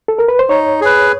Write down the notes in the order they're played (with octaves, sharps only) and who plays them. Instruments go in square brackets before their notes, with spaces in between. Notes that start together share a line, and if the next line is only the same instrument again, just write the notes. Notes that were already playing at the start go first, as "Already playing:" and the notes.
[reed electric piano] A4
A#4
B4
C5
[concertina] D#4 [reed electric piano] C#5
[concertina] G#4 B4